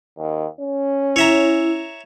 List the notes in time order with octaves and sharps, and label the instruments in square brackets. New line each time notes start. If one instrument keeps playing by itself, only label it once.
[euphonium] D#2
C#4
[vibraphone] E4 [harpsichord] C#5 E5 A#5